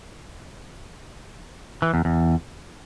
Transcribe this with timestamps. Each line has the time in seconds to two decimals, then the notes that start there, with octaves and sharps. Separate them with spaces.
1.82 E3
1.94 E2
2.05 E2